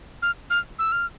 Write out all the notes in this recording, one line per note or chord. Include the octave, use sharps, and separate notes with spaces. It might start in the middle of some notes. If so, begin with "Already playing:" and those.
F6
F6
E6
F6